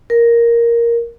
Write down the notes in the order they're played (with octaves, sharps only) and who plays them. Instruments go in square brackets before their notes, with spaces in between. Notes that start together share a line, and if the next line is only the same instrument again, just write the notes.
[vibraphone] A#4